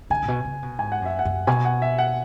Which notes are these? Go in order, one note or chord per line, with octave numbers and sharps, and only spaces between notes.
D3 G#5
A2
B2
C#3
B2
G#2 G#5
F#5
F#2 E5
F#5
F#2
B2 G#5
F#5
E5
F#5